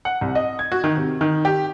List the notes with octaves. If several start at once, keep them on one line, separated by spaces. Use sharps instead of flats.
F#5
C2
D#5
G#6
F#4
D#3
C3
D#3
G4